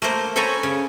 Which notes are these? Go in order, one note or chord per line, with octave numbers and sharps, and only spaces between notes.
A3 A#3 A#4 C5
A4 C5 C#5 G#5 A#5 B5
C#3